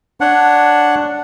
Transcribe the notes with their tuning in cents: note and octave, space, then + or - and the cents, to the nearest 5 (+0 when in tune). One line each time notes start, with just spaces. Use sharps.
D4 +0 C#5 +0 F#5 +0